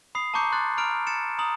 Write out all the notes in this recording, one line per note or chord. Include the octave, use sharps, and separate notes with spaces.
B5 D#6 C7
A5 A#5 C#6 D6 G6 C#7
C6 F#6 A6
A#5 B5 F6 D7
A6 C#7 E7
A#5 D#6 F#7